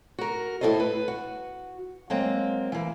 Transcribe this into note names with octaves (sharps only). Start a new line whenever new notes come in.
F#4 A#4
A2 C4 E4 A4 C5 D#5
B4
F#4
F#3 G#3 A#3 C4
E3 A#3